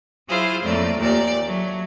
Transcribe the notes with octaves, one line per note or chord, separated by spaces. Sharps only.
F#3 E4 F4 G#4 C5 F5
F2 A2 A3 A#3 D5
D#2 A#2 G4 D5
F#3 A3